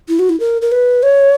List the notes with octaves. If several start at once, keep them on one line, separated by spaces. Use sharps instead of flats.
E4
F#4
E4
A#4
A#4
B4
C#5